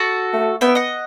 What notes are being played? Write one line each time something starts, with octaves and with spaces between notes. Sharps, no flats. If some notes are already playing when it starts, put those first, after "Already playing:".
Already playing: F#4 A4
A3
B3 E5 G5
D#5 F#5